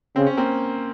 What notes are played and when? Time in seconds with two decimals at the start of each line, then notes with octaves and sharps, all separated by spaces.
0.16 C#3 C4
0.26 C#4
0.37 A#3 C4